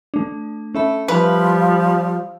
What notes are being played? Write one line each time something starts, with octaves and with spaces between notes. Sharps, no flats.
A3 D4
C#4 A4 E5 B5
F3 G3 B4 F5 E6